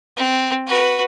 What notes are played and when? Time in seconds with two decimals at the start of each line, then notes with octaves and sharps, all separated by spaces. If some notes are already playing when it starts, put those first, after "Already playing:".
0.17 C4
0.67 F#4 B4